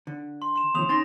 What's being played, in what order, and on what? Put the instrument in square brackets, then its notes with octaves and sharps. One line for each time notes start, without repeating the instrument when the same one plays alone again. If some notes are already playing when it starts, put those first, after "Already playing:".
[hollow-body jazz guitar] D3
[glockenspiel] C6
C6 E7
[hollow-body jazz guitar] D#2 C3 F3 [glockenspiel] C6 D#6 F7
[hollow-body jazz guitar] C#4 D#4 C6 [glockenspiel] A6 A#6